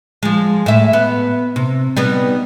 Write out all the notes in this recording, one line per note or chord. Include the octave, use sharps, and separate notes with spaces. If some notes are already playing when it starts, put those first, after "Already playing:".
F3 G#3
A2 E5
B3
C3
G3 B3 D#4